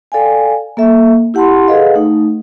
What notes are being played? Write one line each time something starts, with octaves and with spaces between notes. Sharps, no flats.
A4 D5 F5 G5 G#5
A#3 A4 E5
E4 G4 F#5 A5 B5 C6
G#4 A4 B4 D#5 F5 F#5
A3 D#4